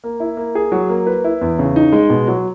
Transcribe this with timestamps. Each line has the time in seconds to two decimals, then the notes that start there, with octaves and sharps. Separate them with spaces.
0.04 A#3
0.20 E4
0.37 A#3
0.55 G#4
0.72 F#3
0.89 A#3
1.07 B4
1.24 E4
1.41 E2
1.59 C#3
1.76 D#4
1.92 G#3
2.10 B2
2.28 F#3